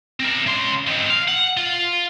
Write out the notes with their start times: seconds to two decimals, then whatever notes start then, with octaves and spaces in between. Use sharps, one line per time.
0.20 C4 A#4
0.46 C#3 C6
0.87 C4 D#4
1.10 F5
1.28 F#5
1.57 F4